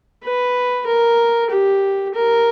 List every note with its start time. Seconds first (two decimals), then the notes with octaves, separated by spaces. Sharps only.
0.24 B4
0.86 A#4
1.50 G4
2.14 A#4